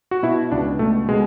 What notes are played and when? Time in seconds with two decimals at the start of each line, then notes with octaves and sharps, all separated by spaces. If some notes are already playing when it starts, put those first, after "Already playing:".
0.11 F#4
0.23 B2 E4
0.52 C#2 D4
0.79 B2 A3
1.08 B2 G#3